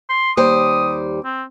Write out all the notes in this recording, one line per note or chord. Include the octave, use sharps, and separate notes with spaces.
C6
D#2 G3 C5 D#6
C4